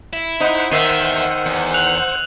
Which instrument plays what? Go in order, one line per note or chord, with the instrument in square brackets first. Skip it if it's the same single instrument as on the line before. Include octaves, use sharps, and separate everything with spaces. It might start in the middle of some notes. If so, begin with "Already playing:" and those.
[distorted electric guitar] E4
[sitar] D#4 [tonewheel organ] C5 F#5
[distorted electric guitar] E2 E5 [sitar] D#3 [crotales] E6 C7 D#7
[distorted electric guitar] E2
[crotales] F#6 F7 F#7